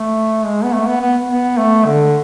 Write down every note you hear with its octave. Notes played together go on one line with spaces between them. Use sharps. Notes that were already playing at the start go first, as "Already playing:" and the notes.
Already playing: A3
G#3
B3
A3
B3
B3
B3
A3
D3